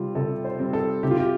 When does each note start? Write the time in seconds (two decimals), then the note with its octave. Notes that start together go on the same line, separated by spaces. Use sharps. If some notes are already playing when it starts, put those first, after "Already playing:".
Already playing: C3 G3 C4 F4
0.15 C3 A4
0.45 C5
0.59 G3 C4
0.73 A4
1.03 C3 G4
1.11 F4
1.19 G4